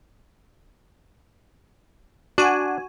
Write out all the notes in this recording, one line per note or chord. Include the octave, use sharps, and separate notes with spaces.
D4 F#4 G#5